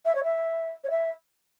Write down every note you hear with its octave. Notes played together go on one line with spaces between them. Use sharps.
E5
C#5
E5
C#5
E5